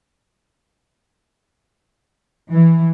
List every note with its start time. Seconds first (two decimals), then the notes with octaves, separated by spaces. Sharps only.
2.51 E3